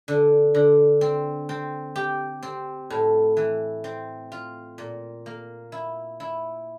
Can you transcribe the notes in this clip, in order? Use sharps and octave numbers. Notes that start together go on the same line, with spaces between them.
D3
D3
C4
C4
G4
C4
A2
E3
C4
F4
A#2
A#3
E4
E4